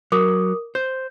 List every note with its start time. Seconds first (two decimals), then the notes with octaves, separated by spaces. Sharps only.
0.12 F#3 A#4 D6 D#6
0.75 C5 G6